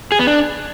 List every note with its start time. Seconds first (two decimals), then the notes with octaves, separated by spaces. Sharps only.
0.12 G#4
0.19 B3
0.27 D4